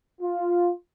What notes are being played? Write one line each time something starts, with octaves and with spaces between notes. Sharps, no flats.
F4